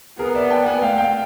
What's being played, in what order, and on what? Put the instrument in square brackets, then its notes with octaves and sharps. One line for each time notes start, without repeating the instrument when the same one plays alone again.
[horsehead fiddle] B3 [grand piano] G#4 A#4
[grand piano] D5 E5
G5 A5
F#5 G#5
[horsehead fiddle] A3 [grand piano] F5 G5
[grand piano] F5 G5